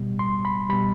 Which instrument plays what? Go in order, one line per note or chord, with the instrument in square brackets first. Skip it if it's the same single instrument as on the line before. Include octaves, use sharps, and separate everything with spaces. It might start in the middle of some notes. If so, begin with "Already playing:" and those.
Already playing: [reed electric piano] B2 G3
C6
B5
B2 G3 B5